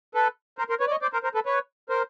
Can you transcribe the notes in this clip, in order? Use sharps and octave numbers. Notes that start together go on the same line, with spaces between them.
A4 B4
A#4 C5
A#4 C5
B4 C#5
D5
C#5 D#5
C5 D5
A#4 C5
A#4 C5
A4 B4
B4 C#5
A#4 C5